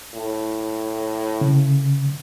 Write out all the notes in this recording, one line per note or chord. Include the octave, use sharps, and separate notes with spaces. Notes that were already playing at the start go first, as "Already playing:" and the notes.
A2
C#3